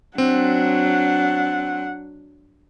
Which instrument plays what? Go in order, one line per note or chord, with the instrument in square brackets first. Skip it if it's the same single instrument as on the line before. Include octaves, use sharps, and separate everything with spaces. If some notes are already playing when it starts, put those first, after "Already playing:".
[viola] F#3 D4 [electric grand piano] C4 [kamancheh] F#5